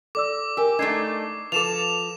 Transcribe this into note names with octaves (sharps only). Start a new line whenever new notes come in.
A4 D5 D6 E6
G4 A#4 G#5 E6
A3 D4 D#4 E6 G#6 C7
F3 A4 B4 D6 E7 F7